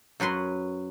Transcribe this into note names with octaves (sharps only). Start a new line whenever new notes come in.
F#2 F#3 B4 C6